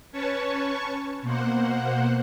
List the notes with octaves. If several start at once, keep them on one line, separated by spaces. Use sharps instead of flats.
C#4 B4 C#5 A5 C#6
B2 A#3 C5 F#5